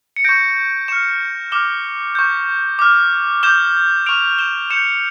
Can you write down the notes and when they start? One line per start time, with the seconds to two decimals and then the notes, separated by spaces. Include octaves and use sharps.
0.16 C#7
0.24 C#6 G6 A#6 D7
0.88 C#6 F6 C#7 E7
1.52 D6 F6 E7 G7
2.15 C#6 G6
2.79 D6 F6
3.43 D6 G6 E7 G7
4.06 C#6 F6 D7 F7
4.39 E7 G7
4.70 C#6 G6 C#7 E7